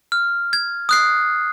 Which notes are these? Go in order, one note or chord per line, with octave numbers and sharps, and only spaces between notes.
F6
G#6
D#6 F#6 C7